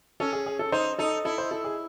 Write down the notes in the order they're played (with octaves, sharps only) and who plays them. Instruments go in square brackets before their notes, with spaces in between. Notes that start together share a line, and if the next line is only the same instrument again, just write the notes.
[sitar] C#4 [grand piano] A4
[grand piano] G#4
G#4
A4
[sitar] D#4 [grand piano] C5
[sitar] D#4 [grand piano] A4
[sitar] E4 [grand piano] A4
[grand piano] C5
A4
G#4